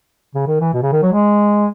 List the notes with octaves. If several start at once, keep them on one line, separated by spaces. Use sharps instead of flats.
C#3
D#3
E3
B2
C#3
D#3
F#3
G#3